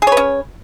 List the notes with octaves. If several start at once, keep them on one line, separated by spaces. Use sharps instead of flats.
C#4 G#4 B4 C#5